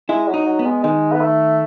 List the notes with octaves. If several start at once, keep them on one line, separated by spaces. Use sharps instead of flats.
G#3 E4
F#3
D#4
F#3
B3
G#3
D#3 G#3
B3
A3